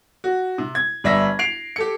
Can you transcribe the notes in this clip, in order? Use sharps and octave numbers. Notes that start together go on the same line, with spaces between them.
F#4
C3
G#6
G1 G3 E5 A#6
C7 D7 F7
G4 A4 C#7